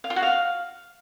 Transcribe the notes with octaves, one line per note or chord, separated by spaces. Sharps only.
F5
F4
F#4
F5